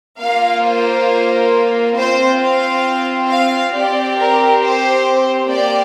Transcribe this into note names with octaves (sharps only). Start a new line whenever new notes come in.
A#3 F4 F5
C5
C4 F4 C5
F5
F5
C4 G4 D5
A#4
C5
A#3 G4 D5